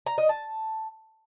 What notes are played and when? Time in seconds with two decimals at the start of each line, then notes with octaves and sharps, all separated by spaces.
0.06 A#5
0.18 D#5
0.29 A5